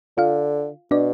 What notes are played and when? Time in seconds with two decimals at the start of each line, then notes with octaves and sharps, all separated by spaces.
0.17 D3 F4 F5
0.91 B2 D4 D5